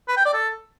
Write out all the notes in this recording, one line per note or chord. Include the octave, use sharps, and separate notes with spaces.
B4
G5
D5
A4